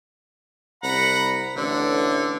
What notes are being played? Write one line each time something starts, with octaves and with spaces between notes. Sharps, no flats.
C2 F#5 A#5 B5
A1 D3